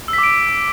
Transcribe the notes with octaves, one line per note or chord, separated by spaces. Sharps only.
E6
B6
D6
D7